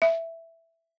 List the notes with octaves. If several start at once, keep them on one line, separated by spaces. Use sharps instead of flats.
E5